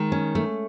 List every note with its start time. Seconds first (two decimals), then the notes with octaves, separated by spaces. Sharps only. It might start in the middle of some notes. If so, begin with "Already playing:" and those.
Already playing: D#3 G#3
0.12 C#4
0.35 A3